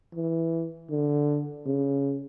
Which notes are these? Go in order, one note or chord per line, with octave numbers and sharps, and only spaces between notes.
E3
D3
C#3